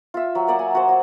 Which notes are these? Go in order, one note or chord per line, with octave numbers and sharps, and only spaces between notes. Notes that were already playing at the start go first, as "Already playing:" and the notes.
F4 E5
F#3
A#3 D5 F#5
G#5
F#4 C5
F#4